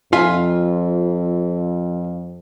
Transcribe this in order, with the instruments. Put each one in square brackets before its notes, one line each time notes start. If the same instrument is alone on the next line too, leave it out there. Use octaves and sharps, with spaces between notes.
[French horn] F2 [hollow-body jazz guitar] F4 E5 G#5